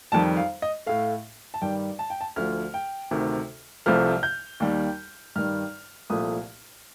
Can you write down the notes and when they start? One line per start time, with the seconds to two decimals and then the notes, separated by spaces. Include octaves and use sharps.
0.12 F2 D#3 G3 A5
0.37 F5
0.62 D#5
0.86 A2 A3 F5
1.54 A5
1.62 G2 D#3 G3 G5
1.99 A5
2.10 G5
2.21 A5
2.36 D2 D3 F3 F6
2.74 G5
3.11 D2 C3 D#3
3.86 C2 C3 F3 A3 F6
4.23 G6
4.60 D#2 D#3 G3
5.36 G2 D#3 G3 F6
6.10 C2 A#2 F3 A3 D#6